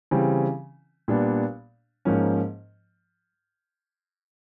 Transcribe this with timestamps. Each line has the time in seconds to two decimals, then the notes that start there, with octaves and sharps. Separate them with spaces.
0.11 C#3 E3 G3 C4
1.08 A#2 G3 B3 D4
2.05 G#2 F3 A#3 C#4